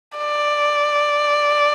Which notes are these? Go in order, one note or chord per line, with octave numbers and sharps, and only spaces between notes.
D5